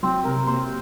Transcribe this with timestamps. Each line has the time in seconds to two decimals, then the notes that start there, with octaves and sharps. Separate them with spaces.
0.03 F#3 C4
0.24 C3 A#4
0.46 A#3 C5